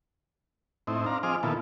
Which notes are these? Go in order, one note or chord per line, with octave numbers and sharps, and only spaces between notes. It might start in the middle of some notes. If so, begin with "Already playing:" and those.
A2 C4 D#4 E4
C4 D4 F5 A#5
F3 C4 G#4 D#5 D6 F6
A#2 D#3 B3 E4 F4 A4